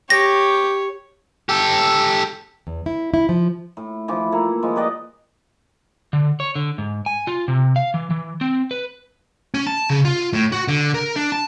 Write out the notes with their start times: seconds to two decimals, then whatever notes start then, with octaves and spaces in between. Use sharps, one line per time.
0.10 G4 C#5 A#6
1.49 G4 A4
2.67 E2
2.86 E4
3.14 E4
3.29 F3
3.77 A2
4.08 E3 F3 D6
4.32 A#3 E4 A4
4.63 F3 G#3
4.76 G4 B4 D5 D#5
6.13 D3
6.40 C#5
6.55 D3
6.78 G#2
7.06 G#5
7.27 F4
7.48 C3
7.76 F5
7.94 E3
8.11 E3
8.41 C4
8.71 B4
9.54 C#4
9.67 A5
9.90 C#3
10.05 F4
10.33 A2
10.52 F#4
10.68 D3
10.94 A#4
11.16 D4
11.32 A5